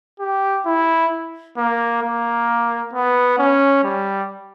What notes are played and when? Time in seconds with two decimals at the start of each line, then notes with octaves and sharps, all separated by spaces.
0.20 G4
0.66 E4
1.57 A#3
2.02 A#3
2.94 B3
3.39 C#4
3.83 G3